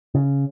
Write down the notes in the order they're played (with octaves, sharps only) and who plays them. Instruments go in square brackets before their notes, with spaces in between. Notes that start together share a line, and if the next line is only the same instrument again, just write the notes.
[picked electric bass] C#3